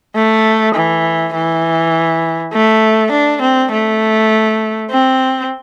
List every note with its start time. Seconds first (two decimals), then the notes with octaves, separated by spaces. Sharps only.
0.15 A3
0.75 E3
1.34 E3
2.53 A3
3.12 D4
3.42 C4
3.71 A3
4.90 C4